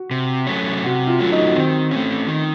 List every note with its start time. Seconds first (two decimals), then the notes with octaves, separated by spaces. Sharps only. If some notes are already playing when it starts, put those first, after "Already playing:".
Already playing: F#4
0.11 C3
0.47 F#3 A3 C#4
0.84 C3 F#4
1.07 F4
1.19 F#3 A3 C#4
1.32 D#4
1.55 D#3 C4
1.91 A3 C#4
2.27 D#3